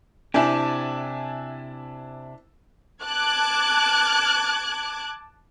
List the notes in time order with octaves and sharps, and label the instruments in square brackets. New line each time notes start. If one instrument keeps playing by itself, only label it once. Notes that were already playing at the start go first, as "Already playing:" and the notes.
[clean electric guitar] C3 G4 [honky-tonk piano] D4 E4 [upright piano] G#5 A5
[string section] A5 D6 F#6 G#6